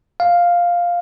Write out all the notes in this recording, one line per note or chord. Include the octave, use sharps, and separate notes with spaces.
F5